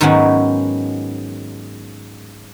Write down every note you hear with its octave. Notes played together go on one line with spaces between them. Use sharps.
G#2 D#3 F#3 B3 C#4 F#5